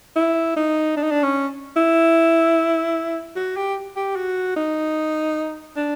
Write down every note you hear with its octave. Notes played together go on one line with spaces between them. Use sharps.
E4
D#4
D4
D#4
D4
C#4
E4
F#4
G4
G4
F#4
D#4
D4